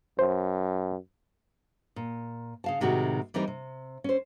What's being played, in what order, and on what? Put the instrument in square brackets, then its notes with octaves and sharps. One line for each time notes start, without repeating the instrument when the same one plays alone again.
[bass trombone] F#2 [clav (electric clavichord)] C5
[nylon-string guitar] A#2
C#3 F5 A5
A2 C3 D#3 G#3 F#4
E3 G3 C4 D#4 A#4
C3
C#4 C5